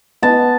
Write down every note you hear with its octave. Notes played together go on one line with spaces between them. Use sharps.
B3 A5